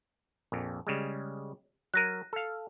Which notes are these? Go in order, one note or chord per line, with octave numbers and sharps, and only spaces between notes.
A#1 F2
C#3 G3 G#3
F#3 A#4 F#6 A#6 D#7
A4 F5